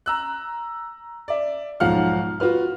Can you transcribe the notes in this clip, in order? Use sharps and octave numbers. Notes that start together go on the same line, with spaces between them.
A#5 E6 F#6
D5 E5
B1 G#2 F3 F5 F#5 F6
F4 F#4 B4 F6